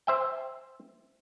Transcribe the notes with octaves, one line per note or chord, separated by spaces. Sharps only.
C5 E5 G5